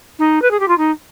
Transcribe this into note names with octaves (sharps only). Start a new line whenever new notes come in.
D#4
B4
G#4
G4
F4
D#4